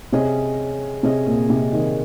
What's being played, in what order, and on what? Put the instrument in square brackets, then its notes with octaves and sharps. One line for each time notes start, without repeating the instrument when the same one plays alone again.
[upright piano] C3 [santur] C#4 G#4 D#5
[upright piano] C3 [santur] C#4 G#4 D#5
[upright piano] A#2
C3
D#3